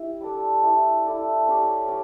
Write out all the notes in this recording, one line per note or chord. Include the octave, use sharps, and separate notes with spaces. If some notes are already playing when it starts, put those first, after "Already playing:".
Already playing: E4 G4
G3 D4 A4 D5
E4 A4 D5
E4 A4 D5
C#4 G4 D5
C#4 G4 D5